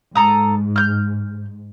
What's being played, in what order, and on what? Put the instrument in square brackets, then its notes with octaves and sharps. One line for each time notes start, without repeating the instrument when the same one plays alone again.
[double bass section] G#2 [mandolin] A4 A#5 D#6
[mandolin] F6 G6